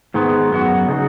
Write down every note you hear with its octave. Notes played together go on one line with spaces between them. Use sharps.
G#2 D#3 G#3 B3
F#2 F#3 B3 F#4
C#3 G#3 D#4 F#4